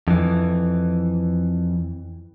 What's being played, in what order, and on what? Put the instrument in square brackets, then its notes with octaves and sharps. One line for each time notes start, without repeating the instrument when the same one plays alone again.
[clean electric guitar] F2 E3